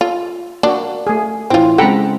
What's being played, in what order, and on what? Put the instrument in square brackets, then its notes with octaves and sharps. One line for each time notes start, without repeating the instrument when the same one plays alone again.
[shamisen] F4 [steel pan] A4
[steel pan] A#3 F#4 [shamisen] D4
[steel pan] A3 G#4
[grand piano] A2 E3 [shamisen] C4 F4
[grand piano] C#3 G#3 C4 [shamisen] A4 G5 [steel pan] F#5 A#5 B5